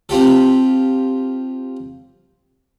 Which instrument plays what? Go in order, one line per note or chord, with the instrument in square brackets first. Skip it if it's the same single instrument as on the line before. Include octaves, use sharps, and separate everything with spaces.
[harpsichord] C4 F4 G4 A4